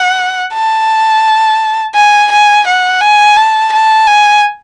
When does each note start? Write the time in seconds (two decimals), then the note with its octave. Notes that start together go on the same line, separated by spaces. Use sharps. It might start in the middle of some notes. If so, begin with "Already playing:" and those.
Already playing: F#5
0.53 A5
1.95 G#5
2.31 G#5
2.67 F#5
3.01 G#5
3.36 A5
3.72 A5
4.07 G#5